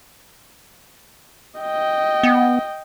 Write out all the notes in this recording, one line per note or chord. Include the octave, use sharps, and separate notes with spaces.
D#5 G5
B3